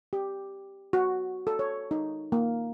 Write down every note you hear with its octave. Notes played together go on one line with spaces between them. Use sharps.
G4
F#4
A4
C#5
D#4
A#3